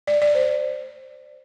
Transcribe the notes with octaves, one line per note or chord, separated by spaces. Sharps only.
D5
D5
C5